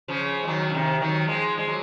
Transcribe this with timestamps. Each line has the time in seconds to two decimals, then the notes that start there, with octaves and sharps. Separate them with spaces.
0.08 C#3 F3
0.43 G#3
0.47 D#3 F#3
0.70 C#3
0.74 C3 D#3
1.00 D#3 F#3
1.27 F3 G#3
1.58 G#3
1.67 F#3